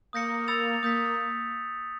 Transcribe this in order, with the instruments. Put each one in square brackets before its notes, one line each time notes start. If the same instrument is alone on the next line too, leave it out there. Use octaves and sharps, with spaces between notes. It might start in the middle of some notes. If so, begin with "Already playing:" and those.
[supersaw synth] A#3 [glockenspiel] D#6 G6 A#6 C#7
[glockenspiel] B5 E6 A6 C#7 F7
[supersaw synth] A#3 [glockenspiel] D#6 G6 B6